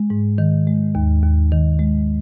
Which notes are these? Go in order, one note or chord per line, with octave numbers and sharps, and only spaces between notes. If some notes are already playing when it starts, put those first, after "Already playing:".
Already playing: G#3
G#2
D#3
G#3
D#2
D#2
D#3
G#3